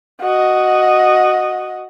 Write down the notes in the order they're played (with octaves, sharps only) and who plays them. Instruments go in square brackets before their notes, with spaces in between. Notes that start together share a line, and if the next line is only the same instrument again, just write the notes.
[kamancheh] F#4 D#5